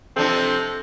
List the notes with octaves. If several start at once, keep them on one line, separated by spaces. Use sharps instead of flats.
C3 F3 C4 D4 A4